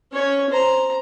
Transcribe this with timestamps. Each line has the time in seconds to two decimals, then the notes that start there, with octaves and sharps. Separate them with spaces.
0.13 C#4 C#5
0.50 C5 A#5